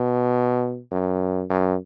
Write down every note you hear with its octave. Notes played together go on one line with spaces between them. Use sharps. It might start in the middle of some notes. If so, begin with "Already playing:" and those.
Already playing: B2
F#2
F#2